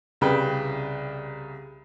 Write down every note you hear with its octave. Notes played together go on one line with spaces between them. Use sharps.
C2 C#3 B4 G5